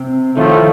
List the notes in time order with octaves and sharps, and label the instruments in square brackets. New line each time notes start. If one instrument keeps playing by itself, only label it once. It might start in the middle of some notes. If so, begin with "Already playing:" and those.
Already playing: [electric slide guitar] C3 C4
[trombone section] A2 F3 A3 [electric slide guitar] D#3 D#4